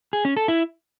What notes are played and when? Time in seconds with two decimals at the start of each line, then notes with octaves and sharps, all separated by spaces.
0.13 G#4
0.25 C#4
0.37 A4
0.48 E4